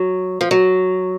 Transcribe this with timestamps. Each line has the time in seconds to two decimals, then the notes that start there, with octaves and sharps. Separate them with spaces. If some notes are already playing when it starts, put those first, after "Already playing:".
Already playing: F#3
0.41 F3
0.51 F#3